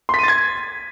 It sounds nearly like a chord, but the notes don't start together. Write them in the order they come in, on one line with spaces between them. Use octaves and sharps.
C6 B6 D#7 A6 G#6